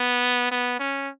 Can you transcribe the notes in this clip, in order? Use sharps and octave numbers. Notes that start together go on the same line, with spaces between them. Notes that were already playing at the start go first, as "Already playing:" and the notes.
Already playing: B3
B3
C#4